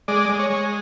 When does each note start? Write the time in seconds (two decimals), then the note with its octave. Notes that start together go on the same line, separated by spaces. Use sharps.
0.08 G#3 D5
0.29 G#3
0.39 C#5
0.50 G#3